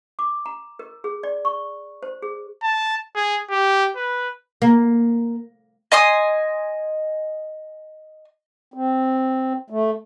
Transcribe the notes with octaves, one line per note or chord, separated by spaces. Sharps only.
D6
A#5
A#4
G#4
D5
C#6
C5
G#4
A5
G#4
G4
B4
A#3
D#5 G#5 C6 D#6
C4
A3